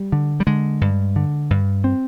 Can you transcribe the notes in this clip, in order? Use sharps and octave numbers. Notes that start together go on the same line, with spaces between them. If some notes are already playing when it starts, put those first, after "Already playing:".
Already playing: G3
D3
G3
D3 G#3
G2
D3
G2
C4